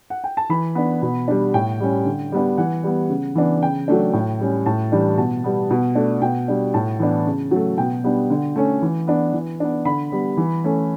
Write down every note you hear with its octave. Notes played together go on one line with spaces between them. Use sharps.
F#5
G5
A5
E3 B5
B3 D4
B2
G3 D4
A2 G5
G3 C#4
D3
G3 B3 D4
E3 F#5
G3 B3
C#3
E3 B3 D4
C#3 G5
F#3 A3 D4
A2
G3 C#4
A2 A5
E3 G3 D4
B2 A5
G3 B3
B2
A3 D4
B2 G5
G3 D4
A2 A5
E3 B3 D4
C#3
F#3 A3
B2 G5
G3 B3 D4
D3
A3 C#4
E3
B3 D4
E3
B3 D4
D3 B5
G3 B3
E3
A3 C#4